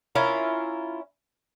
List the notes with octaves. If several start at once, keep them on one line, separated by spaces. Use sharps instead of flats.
C#4 E4 F4 A#4